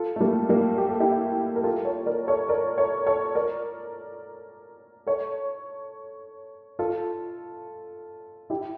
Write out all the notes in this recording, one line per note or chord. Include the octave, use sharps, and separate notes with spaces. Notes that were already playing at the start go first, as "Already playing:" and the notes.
Already playing: F4 A4
A3
G3 A#3
G3 A#3
G4
A4
E4 G4
A#4
F4 A4
A4 C#5
A#4 D5
A4 C#5
A#4 D5
A4 C#5
A4 C#5
A#4 D5
A4 C#5
F4 A4
E4 G4